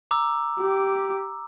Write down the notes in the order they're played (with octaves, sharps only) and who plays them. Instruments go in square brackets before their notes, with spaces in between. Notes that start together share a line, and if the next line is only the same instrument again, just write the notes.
[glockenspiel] A#5 D6 E6
[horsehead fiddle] G4